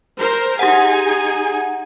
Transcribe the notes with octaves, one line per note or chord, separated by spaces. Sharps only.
A#4 C5
D#4 G4 G#4 F#5 G#5